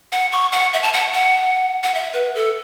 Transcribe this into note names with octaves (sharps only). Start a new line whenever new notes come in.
F#5
C#6
F#5
E5
A5
F#5
F#5
F#5
E5
B4
A4